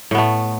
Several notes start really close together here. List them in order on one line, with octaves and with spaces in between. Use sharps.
A2 B3 A3